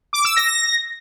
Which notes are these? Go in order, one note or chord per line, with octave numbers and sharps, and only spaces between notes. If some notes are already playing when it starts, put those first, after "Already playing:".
D6
E6
A#6